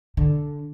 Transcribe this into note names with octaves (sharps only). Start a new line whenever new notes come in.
D3